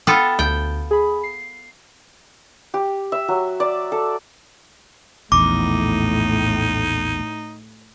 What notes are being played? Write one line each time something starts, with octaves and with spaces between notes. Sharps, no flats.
B3 F4 A4 G5
D2 G5
G#4 B5
C7
G4
E5
F#3
D5
A4
A#1 E2 A2 D#4 D6